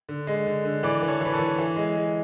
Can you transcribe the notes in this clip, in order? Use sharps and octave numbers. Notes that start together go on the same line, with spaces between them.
D3
G#3
D3
D3
E3 B4 D5
E3
A4 C#5
E3 B4
A4 C#5
E3
E3
G#3
G#3